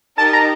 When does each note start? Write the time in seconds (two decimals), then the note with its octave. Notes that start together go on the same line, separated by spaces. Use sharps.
0.18 D#4 G4 A#4 D#5 A5
0.33 A#5